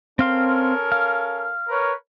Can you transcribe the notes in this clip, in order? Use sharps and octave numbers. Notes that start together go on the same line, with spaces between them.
C4 C#4 A4 A#4 F5 C6
F5
A#4 B4 C#5